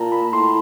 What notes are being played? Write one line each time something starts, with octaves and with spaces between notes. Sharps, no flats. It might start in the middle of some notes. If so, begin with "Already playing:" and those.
Already playing: A#2 A5 A#5
B5
A2 C6